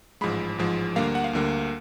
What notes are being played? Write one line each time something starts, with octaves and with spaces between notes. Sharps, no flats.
A1 G#2 F3 G#3 B5
A1 G#2 F3 G#3
D2 D3 G3 A#3 F5
F#5
F5
D2 D3 G3 A#3